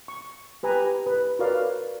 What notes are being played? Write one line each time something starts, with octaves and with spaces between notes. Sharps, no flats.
C#6
G4 B4 G#5 A#5
B4
F#4 A#4 B4 C#5 D5 F5